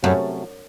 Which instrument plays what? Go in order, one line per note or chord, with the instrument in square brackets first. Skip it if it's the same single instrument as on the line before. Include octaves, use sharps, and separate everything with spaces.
[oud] F#2 [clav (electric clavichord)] C3 F#3 A3 C#4